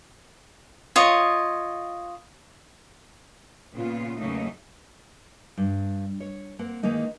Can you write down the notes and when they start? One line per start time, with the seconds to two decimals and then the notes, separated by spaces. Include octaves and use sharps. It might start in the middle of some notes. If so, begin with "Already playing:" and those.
0.96 F4 C#5 D#5
3.75 A#2 C#3 B3 F4
4.17 E2 C#3 F#3 A3 A#3 D#4
5.58 G2
6.20 C#5
6.59 A#3 C4 F#5
6.83 D#3 E3 G#3 A#3 D#4